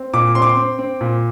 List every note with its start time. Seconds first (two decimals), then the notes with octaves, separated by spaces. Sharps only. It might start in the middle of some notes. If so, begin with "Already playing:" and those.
Already playing: C4
0.13 A#2 D6
0.35 C4 C6
0.42 D6
0.49 C6
0.57 C4
0.79 C4
1.01 A#2